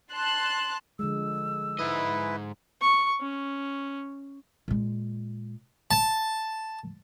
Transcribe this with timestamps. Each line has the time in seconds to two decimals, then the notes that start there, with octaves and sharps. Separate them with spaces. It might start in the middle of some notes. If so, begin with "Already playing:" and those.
0.13 A5 C6 F#6
0.99 D3 F3 G#3 E6
1.79 G#2 E4 B4 D#5
2.81 C#6
3.21 C#4
4.68 A#2 G#3
5.91 A5